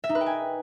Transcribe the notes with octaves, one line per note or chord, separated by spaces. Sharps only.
E5
D#4
B4
G5
G#5